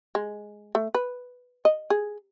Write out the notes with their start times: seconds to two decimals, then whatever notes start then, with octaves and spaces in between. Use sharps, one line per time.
0.15 G#3
0.75 A3
0.95 B4
1.65 D#5
1.90 G#4